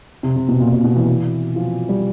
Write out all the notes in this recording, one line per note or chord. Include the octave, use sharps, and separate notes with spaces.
C3
C3
B2
A#2
A#2
B2
E3
F3
G3